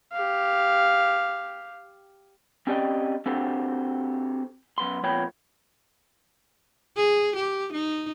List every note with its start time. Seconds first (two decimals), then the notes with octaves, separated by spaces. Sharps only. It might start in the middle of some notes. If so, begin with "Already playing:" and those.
0.13 G4 F5
2.67 C4 C#4 G4 D5 D#5 G5
3.26 C4 D4 F#4 G4 A4 C5
4.78 F#2 B3 C6
5.04 F2 A#2 B3 C#5 G5 B5
6.97 G#4
7.36 G4
7.73 D#4